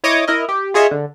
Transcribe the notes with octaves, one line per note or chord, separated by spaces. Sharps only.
E4 C#5 D#5 D6 D#6
E4 A#4 D#5
G4
F4 G#4 C#5 D#5 E5
D3